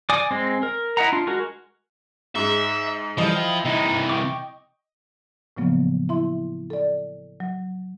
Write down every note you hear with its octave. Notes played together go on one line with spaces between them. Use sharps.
D5 G#5 D6 D#6
G#3 C4
A#4
E4 D#5 F#5 A#5
D4 F4
G#3 F#4 A#4
G#2 G#3 E5
E3 F3 G3 A4 D#5
E4 G5
C3 E3 D#4
G5 C#6 D6
A2 C#3 F3 F#3 A#3 B3
E4 E5 C6
A4 D5
F#3